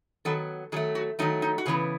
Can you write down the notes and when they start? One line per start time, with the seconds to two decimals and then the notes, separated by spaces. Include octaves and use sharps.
0.25 D#3 F#3 B3 A4
0.72 D#3 F#3 A3 G#4
0.95 F#4
1.19 D#3 F#3 A3 D#4
1.42 D#4
1.58 F#4
1.66 C#3 E3 B3 G#4